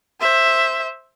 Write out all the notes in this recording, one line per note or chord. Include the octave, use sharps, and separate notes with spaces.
C5 E5